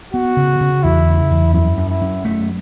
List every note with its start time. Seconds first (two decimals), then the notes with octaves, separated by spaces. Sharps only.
0.13 B3 F#4
0.37 C#3
0.61 C#3
0.84 E2 E4
1.07 C#3
1.31 E2
1.54 F#2 E4
1.77 F#2
1.89 E4
2.01 F#2
2.25 A3